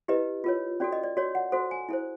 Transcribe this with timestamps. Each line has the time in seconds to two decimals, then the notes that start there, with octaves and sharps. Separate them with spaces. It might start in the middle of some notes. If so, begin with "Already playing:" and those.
0.08 E4 G4 B4 D#5
0.44 F4 A#4 C#5
0.80 C#4 F#4 A4 D5
0.92 D#5
1.03 D5
1.17 F#4 A#4 C#5 D5
1.35 F#5
1.52 F#4 A4 C5
1.71 G#5
1.89 E4 A4 C5